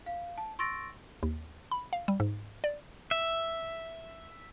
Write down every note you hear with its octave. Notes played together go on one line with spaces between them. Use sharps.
F5
A5
C6 C#6 E6 A6 A#6 D7
D#2
B5
F5
G3
G#2
D5
E5